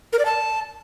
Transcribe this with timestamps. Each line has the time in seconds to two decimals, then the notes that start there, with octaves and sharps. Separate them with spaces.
0.13 A#4
0.19 D5
0.25 A5